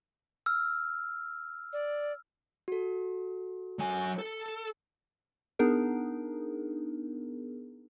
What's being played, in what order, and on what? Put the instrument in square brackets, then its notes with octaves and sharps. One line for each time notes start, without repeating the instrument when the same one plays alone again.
[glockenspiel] E6 F6
[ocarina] D5
[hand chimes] F#4 A4
[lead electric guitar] F#3 G#5
A4
[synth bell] B3 D4 D#4 G#4 A#4